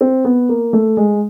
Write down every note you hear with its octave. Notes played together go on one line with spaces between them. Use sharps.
C4
B3
A#3
A3
G#3